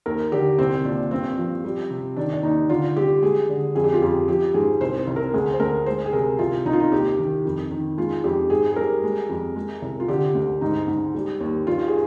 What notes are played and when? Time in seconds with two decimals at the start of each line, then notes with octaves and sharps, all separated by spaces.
0.06 D#2 A#4
0.32 D3 G4
0.58 C2 C4
0.85 A#2 D4
1.11 G2 C4
1.38 F3
1.64 G3
1.90 C3
2.16 D#3 D4
2.33 D4
2.43 D#2 D#4
2.69 D3 F4
2.96 G3 G4
3.22 G#3 G#4
3.49 D3
3.75 F2 G#4
3.84 G4
3.94 F4
4.02 F2 G4
4.28 F3 G4
4.54 G#2 G#4
4.81 C2 C5
4.99 C5
5.07 C2
5.16 A#4
5.34 D2 G#4
5.53 C5
5.60 D2 A#4
5.86 G#3 C5
6.06 G#4
6.13 C3 A#4
6.39 C2 F4
6.65 C2 D#4
6.73 F4
6.80 D#4
6.92 D#2 G4
7.18 D#3
7.45 F2
7.71 D#3
7.97 G#3 F4
8.24 F2 G4
8.50 G#2 G#4
8.72 G#4
8.76 G3 A#4
9.03 G#3
9.29 F2
9.56 G#3
9.82 C2
10.00 F4
10.08 D3 G4
10.35 D2
10.61 G#2 D#4
10.88 G#2
11.15 G3
11.40 D#2
11.67 G2 F4
11.88 G#4